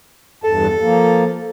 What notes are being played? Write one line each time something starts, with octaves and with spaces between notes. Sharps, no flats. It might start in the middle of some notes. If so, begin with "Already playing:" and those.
E2 G2 A4 A5
F3 A#3